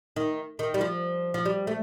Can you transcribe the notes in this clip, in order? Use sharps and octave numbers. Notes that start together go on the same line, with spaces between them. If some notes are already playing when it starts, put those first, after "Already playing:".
D#3
D#3
G3
F3
F3
G3
A3